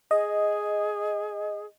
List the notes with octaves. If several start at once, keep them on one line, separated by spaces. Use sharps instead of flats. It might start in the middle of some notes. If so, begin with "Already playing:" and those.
G#4 D#5